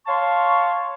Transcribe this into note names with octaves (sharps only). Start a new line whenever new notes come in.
C#5 F5 A5 C6 C#6